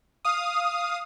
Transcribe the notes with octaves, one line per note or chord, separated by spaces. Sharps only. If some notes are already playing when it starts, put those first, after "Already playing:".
F5 D#6